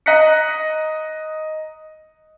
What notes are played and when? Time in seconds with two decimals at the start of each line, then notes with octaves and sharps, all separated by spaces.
0.06 D#5 A#5 F#6 A#6 B6 C#7